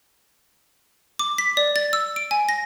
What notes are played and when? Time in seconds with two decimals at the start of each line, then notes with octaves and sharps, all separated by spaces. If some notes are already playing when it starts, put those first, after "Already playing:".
1.19 D6
1.38 B6
1.57 D5
1.76 A6
1.93 E6
2.16 D7
2.31 G#5
2.49 A#6